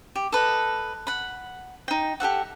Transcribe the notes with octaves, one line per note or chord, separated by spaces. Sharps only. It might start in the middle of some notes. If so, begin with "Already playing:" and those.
G4
A4 B4 D#5
F#5 B5
D#4 G5
G4 A4 E5 F#5